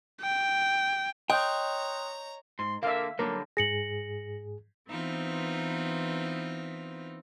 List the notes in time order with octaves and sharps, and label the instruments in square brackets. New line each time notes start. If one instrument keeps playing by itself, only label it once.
[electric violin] G5
[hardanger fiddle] C#5 A#5 [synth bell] D#5 G6 [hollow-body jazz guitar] G5 [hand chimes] C6 D#6 F#6
[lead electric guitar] G#2 [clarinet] C6
[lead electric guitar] D3 A#3 [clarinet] A#4 [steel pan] E5 F5
[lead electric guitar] D3 G3 [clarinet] F#3 [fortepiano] A#3
[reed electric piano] G#2 G#4 [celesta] A#6 C#7 F#7
[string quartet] E3 B3 C4 D#4 F4